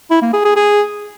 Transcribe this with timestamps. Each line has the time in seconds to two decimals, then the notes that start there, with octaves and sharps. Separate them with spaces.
0.11 E4
0.22 A#3
0.34 G#4
0.45 G#4
0.56 G#4